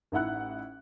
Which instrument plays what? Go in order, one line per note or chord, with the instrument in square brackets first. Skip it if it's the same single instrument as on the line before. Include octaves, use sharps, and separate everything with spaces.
[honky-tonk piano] A1 D#4 E4 F#5 F#6